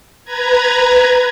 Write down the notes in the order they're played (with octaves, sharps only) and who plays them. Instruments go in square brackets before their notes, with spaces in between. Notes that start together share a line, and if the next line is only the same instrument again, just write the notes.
[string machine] B4 A#5 G#6